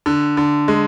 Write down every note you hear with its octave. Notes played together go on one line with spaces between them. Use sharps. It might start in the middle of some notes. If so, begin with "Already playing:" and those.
D3
D3
G#3